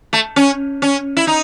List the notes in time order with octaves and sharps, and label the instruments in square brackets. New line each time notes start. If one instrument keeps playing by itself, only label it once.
[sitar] A3
C#4
C#4
E4
D#4